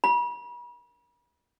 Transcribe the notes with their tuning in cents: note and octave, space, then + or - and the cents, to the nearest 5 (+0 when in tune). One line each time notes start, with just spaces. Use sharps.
B5 -40